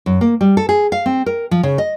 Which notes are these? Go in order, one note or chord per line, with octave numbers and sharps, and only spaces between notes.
F#2
A#3
G3
A4
G#4
F5
C4
A#4
F3
C#3
D#5